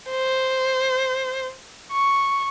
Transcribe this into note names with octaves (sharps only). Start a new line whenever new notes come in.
C5
C#6